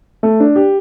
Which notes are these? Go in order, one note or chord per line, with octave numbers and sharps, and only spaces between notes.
A3
D4
G4